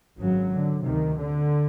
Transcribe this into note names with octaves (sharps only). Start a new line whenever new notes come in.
G#1 F#2 C#3 F#3
D3
D2 C3 D#3
D3